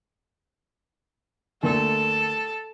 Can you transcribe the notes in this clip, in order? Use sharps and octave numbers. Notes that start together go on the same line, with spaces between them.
D2 A3 A#3 A4